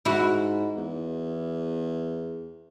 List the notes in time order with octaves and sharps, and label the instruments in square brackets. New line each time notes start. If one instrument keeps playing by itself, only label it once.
[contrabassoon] G#2 [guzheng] E4 F#4
[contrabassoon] E2